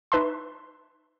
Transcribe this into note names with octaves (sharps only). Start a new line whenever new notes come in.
D#4 B4 E5 A5 C6